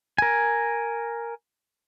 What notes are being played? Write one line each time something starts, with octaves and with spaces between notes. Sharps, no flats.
A#4 G#5